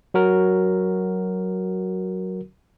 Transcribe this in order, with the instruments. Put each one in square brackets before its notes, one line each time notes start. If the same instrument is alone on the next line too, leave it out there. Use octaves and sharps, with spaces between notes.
[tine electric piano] F#3 F#4 A#4